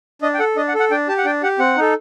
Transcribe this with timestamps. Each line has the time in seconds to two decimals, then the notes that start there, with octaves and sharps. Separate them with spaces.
0.22 D4 D#5
0.34 G5
0.39 A4 F#5
0.56 D4 D#5
0.68 F#5
0.74 A4
0.80 F#5
0.91 D4 G5
1.08 G4 A5
1.18 F#5
1.25 D4 G5
1.43 G4 F#5
1.59 C4 F#5
1.77 D#4 A4